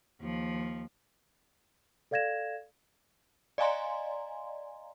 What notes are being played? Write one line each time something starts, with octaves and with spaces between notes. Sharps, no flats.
D#2 F3
A4 D5 F5 G#6 A#6 E7
D5 D#5 F5 G#5 A#5 C6